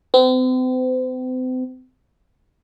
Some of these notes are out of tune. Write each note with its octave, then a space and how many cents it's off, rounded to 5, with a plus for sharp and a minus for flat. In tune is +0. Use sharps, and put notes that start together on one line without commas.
C4 -40